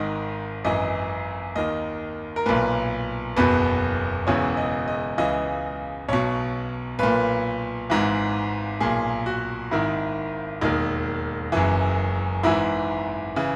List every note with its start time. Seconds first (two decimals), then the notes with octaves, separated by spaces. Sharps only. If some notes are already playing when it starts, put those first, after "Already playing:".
Already playing: G#1 G#2 D#3 D#5
0.64 G#1 F#2 E3 D#5
1.56 D#2 D#3 D#5
2.36 A#4
2.46 B1 A#2 B4
3.36 F#1 E2 B2 B4
4.27 E1 E2 C#3 E3 C#5
4.57 D#5
4.88 D#5
5.18 C#2 C#3 E3 D#5
6.09 B1 B2 C#5
6.99 B1 A#2 B4
7.90 G#1 G#2 E3
8.80 B1 A#2 G#4
9.26 F#4
9.71 G#1 G#2 D#3 E4
10.61 E1 D#2 D#3 D#4
11.52 F#1 F#2 E3
12.43 G#1 G#2 E3 E4
13.36 C#3 E3